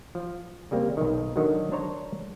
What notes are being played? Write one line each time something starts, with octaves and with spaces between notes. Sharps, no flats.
F3
C#3 G3 A#3 C4
B1 D#3
D3 D#3 F#3
D4 C5 C#5 A#5